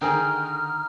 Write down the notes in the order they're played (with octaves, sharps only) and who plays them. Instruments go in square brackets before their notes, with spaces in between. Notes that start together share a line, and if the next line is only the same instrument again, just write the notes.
[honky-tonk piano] D3 D#3 [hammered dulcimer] D#4 [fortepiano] G#4 A#4 G5 [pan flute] F6